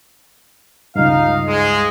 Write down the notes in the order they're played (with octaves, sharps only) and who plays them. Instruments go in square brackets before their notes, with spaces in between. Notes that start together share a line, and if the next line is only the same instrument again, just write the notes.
[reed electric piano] C#2 G2 [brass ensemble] D#4 F5
[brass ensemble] G#2 G#3